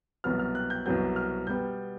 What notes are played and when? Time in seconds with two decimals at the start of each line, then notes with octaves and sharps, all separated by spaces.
0.24 C2 B2 F#3 B3 F6
0.39 F6
0.55 F#6
0.70 G6
0.86 C2 B2 F#3 B3 G6
1.16 F6
1.47 B2 G3 B3 G6